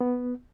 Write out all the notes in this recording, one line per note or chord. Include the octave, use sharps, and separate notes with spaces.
B3